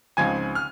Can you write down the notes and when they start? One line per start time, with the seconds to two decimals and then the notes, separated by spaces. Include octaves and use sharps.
0.17 C#2 C#3 F3 C4 D#4 G#5 G#6
0.55 F6